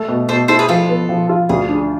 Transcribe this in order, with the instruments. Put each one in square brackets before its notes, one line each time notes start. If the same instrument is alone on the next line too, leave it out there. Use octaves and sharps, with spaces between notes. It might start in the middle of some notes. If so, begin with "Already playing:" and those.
Already playing: [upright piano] A3
B2
[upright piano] B2 [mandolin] A4 C5
[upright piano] E4 [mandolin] A4 C5
[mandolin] G#4 B4
[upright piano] F3 [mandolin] F4 A4
[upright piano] B3
F3
F4
[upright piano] D2 [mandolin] G#4
[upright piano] D4